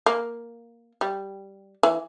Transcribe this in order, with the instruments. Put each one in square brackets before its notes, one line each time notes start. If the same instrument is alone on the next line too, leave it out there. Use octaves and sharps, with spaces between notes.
[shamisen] A#3
G3
E3